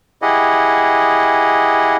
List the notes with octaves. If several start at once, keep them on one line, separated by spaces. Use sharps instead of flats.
E4 G4 G#4 D#5 F#5